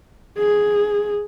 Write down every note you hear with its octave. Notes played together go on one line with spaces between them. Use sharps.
G#4